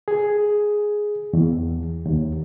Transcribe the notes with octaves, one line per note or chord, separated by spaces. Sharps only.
G#4
E2
D#2